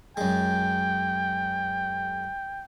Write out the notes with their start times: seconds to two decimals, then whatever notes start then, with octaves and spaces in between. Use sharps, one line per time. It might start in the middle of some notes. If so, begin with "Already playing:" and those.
0.17 F#2 G#3 G5